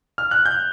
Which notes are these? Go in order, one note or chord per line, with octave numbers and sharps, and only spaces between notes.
F6
F#6
G6